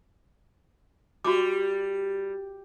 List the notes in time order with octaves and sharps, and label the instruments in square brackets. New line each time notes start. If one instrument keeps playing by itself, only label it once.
[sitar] G3 [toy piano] F#4 G4 D6